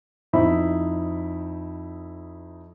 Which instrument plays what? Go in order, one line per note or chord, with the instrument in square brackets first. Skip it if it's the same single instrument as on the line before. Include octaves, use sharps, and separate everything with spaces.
[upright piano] F2 D#4 E4 C5 E5 B5